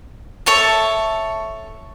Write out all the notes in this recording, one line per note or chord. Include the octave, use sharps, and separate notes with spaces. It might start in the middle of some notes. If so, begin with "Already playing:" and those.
A4 C#5 E5 A5